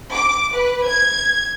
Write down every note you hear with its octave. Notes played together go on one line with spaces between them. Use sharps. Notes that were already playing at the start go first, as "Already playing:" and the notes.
D6
B4
G#6